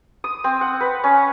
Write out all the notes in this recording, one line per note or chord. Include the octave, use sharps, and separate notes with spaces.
D#6
C4
F#5
B4
C#4